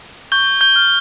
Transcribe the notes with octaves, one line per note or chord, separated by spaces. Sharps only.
C#6 G6 G7
G6 G7
F6